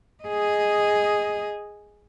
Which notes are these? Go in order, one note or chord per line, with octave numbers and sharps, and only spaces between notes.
G#4 D#5